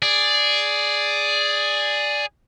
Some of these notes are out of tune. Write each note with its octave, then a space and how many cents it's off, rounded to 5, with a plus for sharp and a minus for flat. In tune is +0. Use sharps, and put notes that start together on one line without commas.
G#4 +0 D5 +0